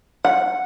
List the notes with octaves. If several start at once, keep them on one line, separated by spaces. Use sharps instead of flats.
F#5